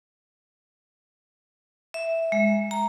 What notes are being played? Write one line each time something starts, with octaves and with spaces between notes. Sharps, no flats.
E5
G#3
A#5